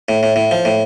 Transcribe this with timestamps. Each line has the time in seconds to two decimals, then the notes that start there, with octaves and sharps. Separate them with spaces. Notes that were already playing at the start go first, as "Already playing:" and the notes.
0.09 A2
0.23 A2
0.36 A2
0.51 F3
0.65 A2